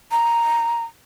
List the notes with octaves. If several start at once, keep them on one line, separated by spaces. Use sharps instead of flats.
A#5